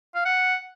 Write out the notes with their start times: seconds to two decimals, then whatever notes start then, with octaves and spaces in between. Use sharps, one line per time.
0.15 F5
0.25 F#5